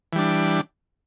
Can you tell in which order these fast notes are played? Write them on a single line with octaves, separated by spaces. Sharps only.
E3 G3 D4